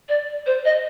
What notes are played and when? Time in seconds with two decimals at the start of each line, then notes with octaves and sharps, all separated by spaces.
0.09 D5
0.46 C5
0.65 D#5